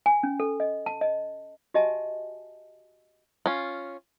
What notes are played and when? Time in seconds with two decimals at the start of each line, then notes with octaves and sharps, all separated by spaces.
0.06 G#5
0.23 C#4
0.40 A4
0.60 D#5
0.86 A5
1.01 D#5
1.74 F#4 G4 D#5 E5 G#5 A5
3.46 C#4 F4